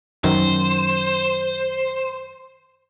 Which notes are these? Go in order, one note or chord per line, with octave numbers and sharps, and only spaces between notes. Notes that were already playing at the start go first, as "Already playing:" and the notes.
F#2 D#3 C5